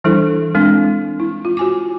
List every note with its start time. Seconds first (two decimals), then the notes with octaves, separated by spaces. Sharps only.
0.04 E3 G3 D4 E4 A4
0.55 G#3 C4 D4
1.20 E4
1.45 F4
1.57 F#4 G#5 D6